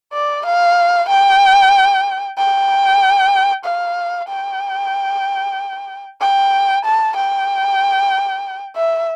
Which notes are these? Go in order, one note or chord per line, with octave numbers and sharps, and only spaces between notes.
D5
F5
G5
G5
F5
G5
G5
A5
G5
E5